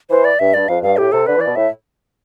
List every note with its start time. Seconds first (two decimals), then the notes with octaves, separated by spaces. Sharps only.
0.10 E3 C5
0.25 D5
0.39 G2 E5
0.54 G2 D5
0.68 F2 F5
0.83 G2 F5
0.97 A2 G4
1.12 C3 A4
1.27 D3 B4
1.36 E3
1.41 D5
1.46 B2
1.56 A2 E5